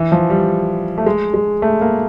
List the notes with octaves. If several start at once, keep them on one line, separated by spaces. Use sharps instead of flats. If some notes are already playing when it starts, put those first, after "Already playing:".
Already playing: E3
F3
G3
A3
G#3
G#3
A3
A#3